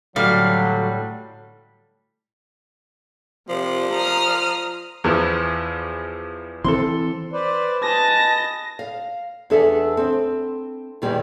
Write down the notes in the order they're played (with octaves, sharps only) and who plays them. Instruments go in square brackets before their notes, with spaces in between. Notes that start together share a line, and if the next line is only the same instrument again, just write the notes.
[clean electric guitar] A2 G3 [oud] D3 [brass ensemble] F#3 [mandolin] F5
[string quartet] C3 [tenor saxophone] F3
[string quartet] A#5 D#6 F6
[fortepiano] E2 E3 F3
[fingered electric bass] E3 C4 [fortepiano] A4 C6
[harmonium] B4 C5 D5
[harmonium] B4 D#5 G#5 [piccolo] A5 [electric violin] A#6
[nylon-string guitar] F5
E2 D4 G#4 A4 E5
C4
E2 A#2 D#3 E3 G3 G#3